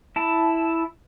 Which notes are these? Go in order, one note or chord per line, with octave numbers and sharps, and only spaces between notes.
E4 A5